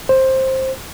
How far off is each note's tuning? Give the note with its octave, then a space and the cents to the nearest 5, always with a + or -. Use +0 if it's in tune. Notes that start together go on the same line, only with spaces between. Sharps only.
C5 +15